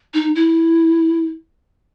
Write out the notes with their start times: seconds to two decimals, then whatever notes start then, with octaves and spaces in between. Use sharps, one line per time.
0.14 D#4
0.35 E4